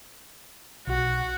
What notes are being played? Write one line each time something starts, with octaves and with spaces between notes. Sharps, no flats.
B1 F#4